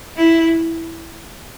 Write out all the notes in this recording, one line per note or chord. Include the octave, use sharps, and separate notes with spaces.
E4